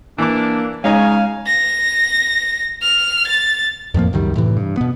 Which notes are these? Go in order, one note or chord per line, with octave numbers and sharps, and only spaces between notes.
E3 A#3 D4 D6
C#3 G#3 C#4 D#4 F5 G#5
A#6
F6
A6
F2 A2 F3 A#3
C#2 F#2 D#3 G3
A2 C3 E3
G2
B2 B3